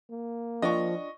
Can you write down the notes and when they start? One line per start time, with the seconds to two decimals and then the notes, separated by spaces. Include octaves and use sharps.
0.11 A#3
0.62 F3 D4 F4 D#5 G5 C#6